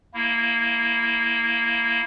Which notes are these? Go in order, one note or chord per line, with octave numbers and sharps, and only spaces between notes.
A#3 E4